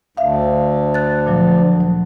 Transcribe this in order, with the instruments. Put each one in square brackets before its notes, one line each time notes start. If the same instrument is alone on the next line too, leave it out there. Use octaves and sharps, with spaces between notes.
[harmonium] D2 [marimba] E5 F5
[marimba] F#6 A6
A#2 F3 F#3
F#3